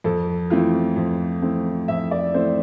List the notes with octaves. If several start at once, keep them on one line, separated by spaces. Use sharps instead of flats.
F2 A4
E3 A3 C4 F4
F2
E3 A3 C4
F2 E5
D5
E3 A3 C4 C5